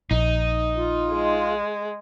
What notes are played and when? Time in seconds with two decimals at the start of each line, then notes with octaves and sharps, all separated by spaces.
0.11 A#1 D#4
0.77 F4
1.11 G#3